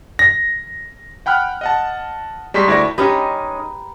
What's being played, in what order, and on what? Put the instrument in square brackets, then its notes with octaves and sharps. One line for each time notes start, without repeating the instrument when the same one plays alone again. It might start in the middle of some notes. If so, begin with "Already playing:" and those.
[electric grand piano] A#6
F#5 G5 B5 F6 F#6
D#5 F#5 A5
G3 G#3 A#5 C6 C#6 B6
D2 E4 D5 E5 C#6 A#6
[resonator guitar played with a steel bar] G#3 C#4 D#4 [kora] G4 [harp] B4 [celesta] A#5 B5